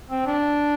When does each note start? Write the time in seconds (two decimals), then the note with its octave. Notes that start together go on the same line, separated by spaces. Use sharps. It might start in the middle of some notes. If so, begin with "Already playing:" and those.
0.10 C4
0.27 D4